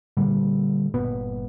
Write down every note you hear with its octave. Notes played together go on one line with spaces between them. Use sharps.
A#2 D3 G3
G1 A#2 B3